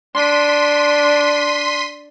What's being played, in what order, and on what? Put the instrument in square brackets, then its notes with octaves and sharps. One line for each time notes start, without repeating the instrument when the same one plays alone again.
[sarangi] D4 [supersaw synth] C6 B6 D#7